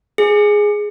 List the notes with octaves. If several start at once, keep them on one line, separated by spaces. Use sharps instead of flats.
G#4